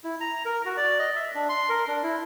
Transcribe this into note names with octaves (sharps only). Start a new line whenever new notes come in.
E4
A#5
A#4
F#4
D5
D#5
E5
D4
C6
A#4
D4
E4